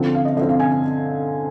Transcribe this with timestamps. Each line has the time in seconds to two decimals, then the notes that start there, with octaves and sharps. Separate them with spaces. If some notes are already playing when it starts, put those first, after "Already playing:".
Already playing: D3 F3 C4
0.15 F5
0.25 D#5
0.37 D3 F3 C4 D#5
0.49 F5
0.59 G#5